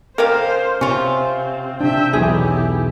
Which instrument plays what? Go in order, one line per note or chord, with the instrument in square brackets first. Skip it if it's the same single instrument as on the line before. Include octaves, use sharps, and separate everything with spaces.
[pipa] C#3 G4 F5 [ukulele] A#4 [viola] C5
[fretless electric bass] C3 [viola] C4 [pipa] C#4 F4
[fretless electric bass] C3 D4 [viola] E5 G5
[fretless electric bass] E1 B1 E3 [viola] E4 G4 [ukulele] G#4